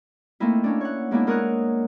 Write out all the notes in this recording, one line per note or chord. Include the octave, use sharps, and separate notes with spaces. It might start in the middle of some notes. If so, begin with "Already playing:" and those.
A3 A#3 C4 D#4 E4
A#3 C#4 D4
C#5 F#5
G#3 A#3 B3 D4 E4
G#3 A#4 C#5 D#6 F#6